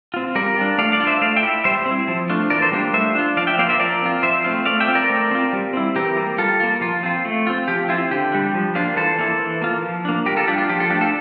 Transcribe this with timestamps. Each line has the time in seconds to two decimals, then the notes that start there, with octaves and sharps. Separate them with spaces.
0.14 C4 F4
0.35 G3 A#4 D5
0.56 D4 F4
0.78 A3 D5 F5
0.92 D5 F5
1.00 D4 F4
1.07 C5 E5
1.22 A3 D5 F5
1.36 E5 G5
1.43 E4
1.64 G3 C5 E5
1.85 C4
1.91 E4
2.08 F3
2.30 A3 D4 F4
2.50 E3 A#4 D5
2.62 A4 C5
2.72 G3 A#3 D4 F4
2.93 A3 C5 E5
3.15 D4 F4
3.37 F3 D5 F5
3.47 E5 G5
3.59 A#3 F4 D5 F5
3.69 C5 E5
3.80 F3 A#4 D5
4.02 C4 F4
4.23 F3 C5 E5
4.44 A3 C4 F4
4.66 A3 D5 F5
4.80 E5 G5
4.88 C4 F4
4.95 A#4 D5
5.10 A3
5.31 C4 F4
5.53 G3
5.73 C4 E4
5.96 E3 G4 A#4
6.16 G3 A#3
6.38 G3 F4 A4
6.60 A#3 F4
6.81 F3 F4
7.03 C4 F4
7.25 A3
7.47 C4 F4
7.68 F3 G4
7.89 C4 E4 F4
8.11 D3 G4
8.32 G3 D4
8.54 F3
8.75 A#3 D4 F4
8.97 E3 A4 C5
9.19 A#3 E4
9.40 E3
9.62 A#3 F4
9.82 F3
10.05 A#3 D4
10.26 G3 G4 A#4
10.36 F4 A4
10.47 D4 F4 G4
10.58 F4
10.69 F3 G4
10.80 F4 A4
10.90 A3 D4 G4
11.01 F4 A4